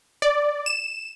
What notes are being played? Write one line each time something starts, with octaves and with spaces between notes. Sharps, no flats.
D5
E7